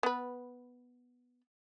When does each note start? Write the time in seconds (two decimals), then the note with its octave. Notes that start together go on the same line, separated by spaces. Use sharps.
0.03 B3 B4